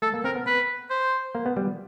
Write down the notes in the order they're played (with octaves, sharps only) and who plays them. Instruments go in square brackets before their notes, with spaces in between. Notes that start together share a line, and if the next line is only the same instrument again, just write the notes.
[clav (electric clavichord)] A3 [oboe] A4
[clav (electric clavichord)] A#3
[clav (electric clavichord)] C4 [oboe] A#4
[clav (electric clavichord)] B3
[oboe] B4
C5
[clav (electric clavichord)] A#3
B3
G3